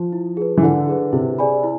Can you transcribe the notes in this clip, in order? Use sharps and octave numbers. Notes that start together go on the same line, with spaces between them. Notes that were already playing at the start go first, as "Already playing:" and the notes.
Already playing: F3
E4
G#4 B4
E3
D3 E4
G#4 B4
C3 E4
G#4 D5 G#5 B5
E4